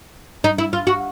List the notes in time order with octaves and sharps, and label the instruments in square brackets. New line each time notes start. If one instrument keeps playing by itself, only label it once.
[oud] D#4
E4
F4
F#4